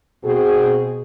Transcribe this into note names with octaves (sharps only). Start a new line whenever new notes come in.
B2 C4 F#4 G#4